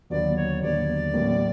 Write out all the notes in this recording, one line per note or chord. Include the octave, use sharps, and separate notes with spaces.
D#2 D3 F#3 B3 D5
C#5
D#2 D3 F#3 B3 D5
A1 A2 F#3 A#3